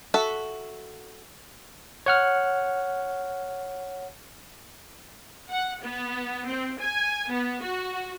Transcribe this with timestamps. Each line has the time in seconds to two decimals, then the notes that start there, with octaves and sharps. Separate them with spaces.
0.14 F#4 A4 E5
2.06 C#5 F#5 F6
5.50 F#5
5.81 B3
6.47 C4
6.81 G#5
7.29 B3
7.63 F#4